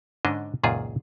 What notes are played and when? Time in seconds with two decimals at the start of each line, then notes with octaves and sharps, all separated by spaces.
0.25 G#2 D3 C#4 D4 D#5
0.63 C#2 F#2 A#2 D#3 F4 G#4